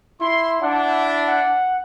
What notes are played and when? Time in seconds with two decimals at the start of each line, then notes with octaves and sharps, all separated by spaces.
0.21 E4 C6
0.61 D4 E4 F#5
1.27 F#5